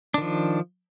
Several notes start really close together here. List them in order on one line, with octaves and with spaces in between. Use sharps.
D4 D#3 F3